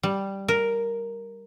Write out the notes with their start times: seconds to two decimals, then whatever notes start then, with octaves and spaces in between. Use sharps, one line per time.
0.03 G3
0.48 A#4